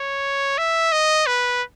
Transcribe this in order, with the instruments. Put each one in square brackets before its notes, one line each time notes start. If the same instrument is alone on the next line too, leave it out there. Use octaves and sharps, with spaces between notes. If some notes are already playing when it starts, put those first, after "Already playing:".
Already playing: [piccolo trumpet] C#5
E5
D#5
B4